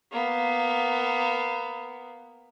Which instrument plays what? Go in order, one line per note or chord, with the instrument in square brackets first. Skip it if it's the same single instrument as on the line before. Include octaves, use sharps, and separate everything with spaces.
[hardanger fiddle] A#3 B3